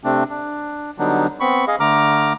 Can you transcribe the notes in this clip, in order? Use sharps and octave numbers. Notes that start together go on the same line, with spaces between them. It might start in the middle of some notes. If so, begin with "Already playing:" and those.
C3 A3 C4 D4
D4
D3 F#3 G3 B3 D4 D#4
B3 C4 B5 C#6
G#4 D#5 F5
D3 A3 A#5 D6 F6